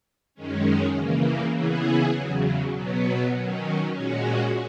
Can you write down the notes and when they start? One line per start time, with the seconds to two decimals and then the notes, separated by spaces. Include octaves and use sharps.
0.35 F#2 D#3 G#3 C#4
0.94 C#3 E3 A#3
1.54 C#3 E3 B3 E4 G#4
2.13 E2 C#3 F#3
2.73 B2 F#3 B3
3.33 D#3 F#3 C#4
3.93 A#2 G#3 C#4 F#4